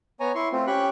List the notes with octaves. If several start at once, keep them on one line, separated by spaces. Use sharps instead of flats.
B3 C#5 G#5 A#5
E4 C6 C#6
A3 C4 F4
C#4 G4 G5 B5 C#6 F#6